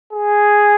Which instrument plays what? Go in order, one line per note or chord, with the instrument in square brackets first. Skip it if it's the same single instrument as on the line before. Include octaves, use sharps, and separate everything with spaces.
[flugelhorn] G#4